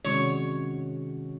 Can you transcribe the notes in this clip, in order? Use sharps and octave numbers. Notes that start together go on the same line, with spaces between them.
C3 D#3 G#3 C#4 F#4 C#5